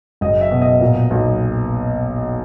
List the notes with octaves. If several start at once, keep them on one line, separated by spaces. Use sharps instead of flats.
F#1 D#5
E5
B2
D#5
A#2
B1